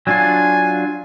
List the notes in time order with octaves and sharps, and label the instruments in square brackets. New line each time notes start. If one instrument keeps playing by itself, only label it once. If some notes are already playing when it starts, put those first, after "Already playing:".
[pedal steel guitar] F#3 D4 F4 [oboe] G#5